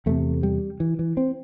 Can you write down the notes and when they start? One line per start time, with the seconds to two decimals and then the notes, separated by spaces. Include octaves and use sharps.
0.06 E2 C3 A3
0.43 G3
0.80 E3
0.99 E3
1.17 C4